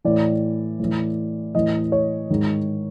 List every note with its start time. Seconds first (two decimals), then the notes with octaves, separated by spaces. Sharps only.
0.05 A2 E3 D5
0.80 A2 E3
1.55 A2 E3 D#5
1.92 C#5
2.30 G#2 D#3